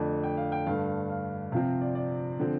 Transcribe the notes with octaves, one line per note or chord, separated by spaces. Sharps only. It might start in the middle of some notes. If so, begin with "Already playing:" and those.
Already playing: F2 D3 A3 D4
G5
F5
G5
G2 D3 A3 F5
F5
C3 F3 C4 F5
D5
D5
D3 F3 C4